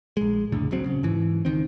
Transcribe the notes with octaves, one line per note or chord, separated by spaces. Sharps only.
A#1 G#3
F1 C#2 A2 D3
D#1 B1 F#3 C4
C#3
G#2 E3
C#2 D#3 C4